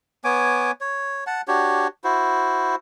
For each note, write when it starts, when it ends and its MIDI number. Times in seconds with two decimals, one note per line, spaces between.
0.24 0.71 59
0.24 0.71 73
0.24 0.71 80
0.24 0.71 86
0.81 1.24 73
1.27 1.42 78
1.27 1.42 81
1.48 1.87 62
1.48 1.87 66
1.48 1.87 67
1.48 1.87 73
2.04 2.75 64
2.04 2.75 66
2.04 2.75 72